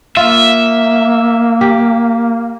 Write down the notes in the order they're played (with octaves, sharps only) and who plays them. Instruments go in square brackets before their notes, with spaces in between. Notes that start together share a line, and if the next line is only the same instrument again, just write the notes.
[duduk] A#3 [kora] F4 [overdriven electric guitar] E5
[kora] G4